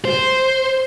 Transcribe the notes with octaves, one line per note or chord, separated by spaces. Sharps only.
C5